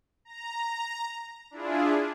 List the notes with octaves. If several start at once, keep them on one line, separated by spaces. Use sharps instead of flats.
A#5
D4 E4 F4 G#4